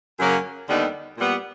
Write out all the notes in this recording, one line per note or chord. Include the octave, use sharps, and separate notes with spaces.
F#2 C#3 F#3 A#3 C#4
D#2 D3 G3 B3 D#4
A#2 G3 B3